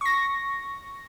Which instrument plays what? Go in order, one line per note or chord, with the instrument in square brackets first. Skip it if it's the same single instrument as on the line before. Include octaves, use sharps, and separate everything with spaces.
[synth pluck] C#6 A#6